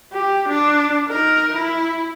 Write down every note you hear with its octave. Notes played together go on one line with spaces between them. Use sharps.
G4
D4
D#4 A#4
E4